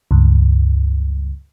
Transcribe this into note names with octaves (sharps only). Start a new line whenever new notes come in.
C#2 G2